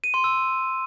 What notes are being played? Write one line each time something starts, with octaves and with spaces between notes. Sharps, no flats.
D#7
C6
E6